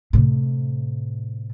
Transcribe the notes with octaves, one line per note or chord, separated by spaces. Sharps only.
A2 C3